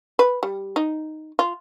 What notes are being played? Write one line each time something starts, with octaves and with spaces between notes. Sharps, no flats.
B4
G3
D#4
F4